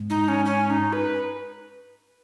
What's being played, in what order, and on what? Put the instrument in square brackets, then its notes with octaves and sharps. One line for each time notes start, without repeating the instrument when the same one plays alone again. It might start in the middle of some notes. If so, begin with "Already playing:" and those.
Already playing: [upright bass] G#2
[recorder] D#4
C#4
C#4
D#4
B4